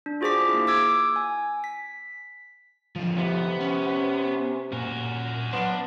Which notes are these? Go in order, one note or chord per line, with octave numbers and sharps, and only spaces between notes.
D4
F4 F#4 G#4 C5 D6 B6
A#3 E4
D6 E6 G#6 D7
G#5
B6
D3 F3
C3 B3
C#4
A#2 F#4 A#4
F#3 B3 D4 C6